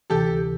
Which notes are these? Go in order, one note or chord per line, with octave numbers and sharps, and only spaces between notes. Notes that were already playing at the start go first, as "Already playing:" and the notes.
D2 C3 E3 G4 A4